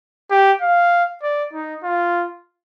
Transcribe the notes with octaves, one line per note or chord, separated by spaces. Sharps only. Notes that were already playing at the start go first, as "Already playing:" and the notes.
G4
F5
D5
D#4
F4